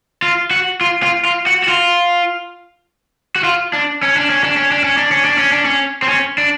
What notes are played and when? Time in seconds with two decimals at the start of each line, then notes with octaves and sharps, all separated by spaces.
0.22 F4
0.51 F#4
0.81 F4
1.03 F4
1.25 F4
1.46 F#4
1.64 F#4
1.68 F4
3.36 F#4
3.44 F4
3.73 D4
4.03 C#4
4.17 D4
4.30 C#4
4.44 D4
4.57 C#4
4.71 D4
4.84 C#4
4.97 D4
5.11 C#4
5.25 D4
5.38 C#4
5.52 D4
5.65 C#4
6.02 C4
6.08 C#4
6.38 D4